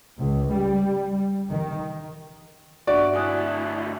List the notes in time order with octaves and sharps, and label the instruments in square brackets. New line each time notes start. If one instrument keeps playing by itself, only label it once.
[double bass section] C#2
G3
D#3
[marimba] G2 D4 E5 [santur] F#4 [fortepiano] D5
[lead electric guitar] D2 E4 [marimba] G#5 D#6 F#6